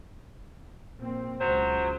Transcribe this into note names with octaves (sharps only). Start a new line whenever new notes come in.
A#1 A#3 C4
C#2 B2 F#3 C5